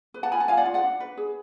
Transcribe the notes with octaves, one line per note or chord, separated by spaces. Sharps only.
B4
F#5 A5
F4 G#5 B5
F#5 A5
F4 F5 G#5
D5 F#5
F4
D5 F#5
D4
B4
G#4